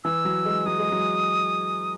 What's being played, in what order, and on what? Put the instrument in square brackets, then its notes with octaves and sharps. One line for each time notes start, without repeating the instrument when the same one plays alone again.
[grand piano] E3 [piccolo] E6
[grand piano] F#3
G#3
[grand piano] F#3 [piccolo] D#6
[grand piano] G#3
F#3